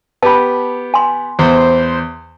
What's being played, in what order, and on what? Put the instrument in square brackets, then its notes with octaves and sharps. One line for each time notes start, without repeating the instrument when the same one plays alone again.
[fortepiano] B3 G4 [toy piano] A5 B5
[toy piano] G#5 C6
[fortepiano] E2 [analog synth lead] C5